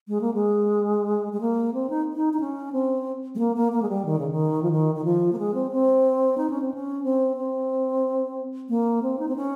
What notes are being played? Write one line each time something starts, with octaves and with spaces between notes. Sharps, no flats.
G#3
A#3
G#3
G#3
A#3
C4
D#4
D#4
D#4
C#4
C4
G#3
A#3
A#3
A#3
G#3
G3
D#3
C#3
D#3
F3
D#3
D#3
F3
A#3
G#3
C4
C4
D#4
C#4
C4
C#4
C4
C4
A#3
C4
D#4
C4
C#4